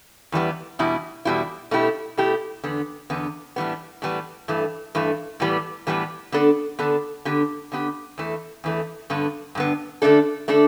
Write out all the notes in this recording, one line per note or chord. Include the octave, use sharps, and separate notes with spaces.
E2 E3 G3 B3
E2 B2 G3 E4
E2 B2 G3 E4
B2 A3 E4 G4
B2 A3 E4 G4
E2 D3 B3
E2 D3 B3
A2 E3 G3 B3
A2 E3 G3 B3
G2 E3 A3
G2 E3 A3
A2 E3 G3 B3
A2 E3 G3 B3
D3 B3 D4 A4
D3 B3 D4 A4
D3 B3 G4
D3 B3 G4
E2 E3 A3
E2 E3 A3
G2 D3 B3
G2 D3 B3
D3 A3 D4 A4
D3 A3 D4 A4